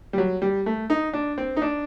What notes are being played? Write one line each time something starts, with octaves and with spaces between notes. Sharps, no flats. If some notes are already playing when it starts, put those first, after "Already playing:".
G3
F#3
G3
A3
D#4
D4
C4
D#4
D4